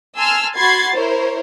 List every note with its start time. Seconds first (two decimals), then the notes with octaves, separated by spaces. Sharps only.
0.17 G#5 A5 C6 E6 F6
0.56 F#4 B5 C6 G#6 A6 C7
0.94 E4 A#4 C5 C#5